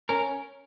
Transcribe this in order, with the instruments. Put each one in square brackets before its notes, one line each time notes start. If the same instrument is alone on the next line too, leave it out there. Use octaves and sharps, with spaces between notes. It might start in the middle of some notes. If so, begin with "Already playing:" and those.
[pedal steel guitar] C#4 A#4